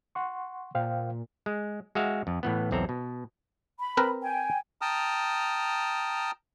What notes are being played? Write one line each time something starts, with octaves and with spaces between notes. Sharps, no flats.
F#5 C6 C#6
A#2 C5 F5 G5
G#3
G#3 F#4 E5 F5
F2
A2 E3 B3
B1 E2 C4 A4 A#5
B2
B5
C4 A#4 B4
G5 G#5
G5 A5 A#5 D#6 F6